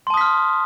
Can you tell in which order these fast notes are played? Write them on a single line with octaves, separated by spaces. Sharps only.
C6 A5 D#6 B6 F6